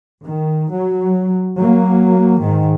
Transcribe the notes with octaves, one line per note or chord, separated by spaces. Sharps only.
D#3
F#3
F#3 A#3
G#2 D#3